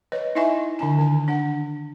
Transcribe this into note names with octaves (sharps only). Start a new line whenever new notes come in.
B4 C#5 D#5
D#4 E4 D#5 E5 G#5 C#6
D3 D4 G#5
D#3 G#5
D4 F#5